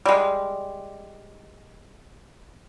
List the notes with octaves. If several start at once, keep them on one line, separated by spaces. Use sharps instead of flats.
G3 G#3